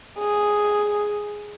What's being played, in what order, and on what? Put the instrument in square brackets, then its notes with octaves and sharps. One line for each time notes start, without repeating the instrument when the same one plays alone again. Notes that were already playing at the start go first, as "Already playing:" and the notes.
[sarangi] G#4